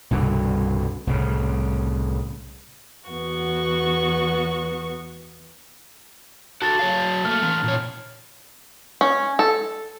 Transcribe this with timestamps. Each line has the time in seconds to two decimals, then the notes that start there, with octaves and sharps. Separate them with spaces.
0.11 C2 G2 B2 D3
1.07 C2 A2 C#3
3.10 E2 B3 F#4 C#6
6.62 F#4 A4 A5 A6
6.79 F#3 C#5 F5
7.25 A3 A#3 F6
7.43 E3 C#4 A#5
7.64 A#2 C#5
9.01 C#4
9.39 A4